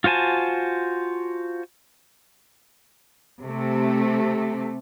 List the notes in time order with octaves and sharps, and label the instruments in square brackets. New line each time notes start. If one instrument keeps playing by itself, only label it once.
[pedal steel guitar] F4 F#4 C5 G#5 A5
[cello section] C3 A3